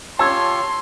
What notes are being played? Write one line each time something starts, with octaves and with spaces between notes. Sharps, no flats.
F4 G4 C#5 A5 C6 E6 G#6